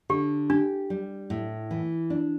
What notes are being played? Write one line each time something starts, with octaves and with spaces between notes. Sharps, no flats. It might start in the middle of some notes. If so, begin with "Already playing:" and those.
D3 G4
D4 G4
G3
A2
E3
D4